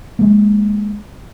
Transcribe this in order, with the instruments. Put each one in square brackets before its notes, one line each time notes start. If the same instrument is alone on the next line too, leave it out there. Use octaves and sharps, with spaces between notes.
[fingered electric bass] G#3 A#3